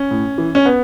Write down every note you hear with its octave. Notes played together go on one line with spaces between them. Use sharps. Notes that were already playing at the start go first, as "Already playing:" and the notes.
Already playing: C#4
A2
E3
C#4
B3